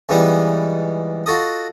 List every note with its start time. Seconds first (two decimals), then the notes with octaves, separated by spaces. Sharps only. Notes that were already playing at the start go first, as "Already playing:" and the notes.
0.09 C#2 G#2 E3 G3 B3
1.26 F4 F#4 A4 D#5